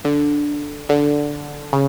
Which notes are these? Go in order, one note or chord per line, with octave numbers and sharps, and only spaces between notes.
D3
D3
C#3